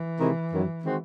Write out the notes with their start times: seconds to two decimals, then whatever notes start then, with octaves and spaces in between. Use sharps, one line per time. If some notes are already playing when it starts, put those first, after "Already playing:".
Already playing: E3
0.19 C3 D#3 G#3 C4 E4
0.51 F#2 D#3 F#3
0.84 D#3 G#3 C4 F#4